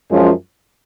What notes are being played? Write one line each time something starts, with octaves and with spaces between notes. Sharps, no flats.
F#2 F3 G#3 C#4 F4